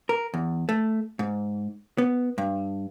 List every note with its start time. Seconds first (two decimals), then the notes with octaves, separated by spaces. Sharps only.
0.09 A#4
0.34 E2
0.69 A3
1.19 G#2
1.98 B3
2.38 G2